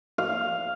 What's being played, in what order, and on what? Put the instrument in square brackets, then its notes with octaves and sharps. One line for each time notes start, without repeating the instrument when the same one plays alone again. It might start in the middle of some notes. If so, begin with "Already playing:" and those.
[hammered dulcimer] F5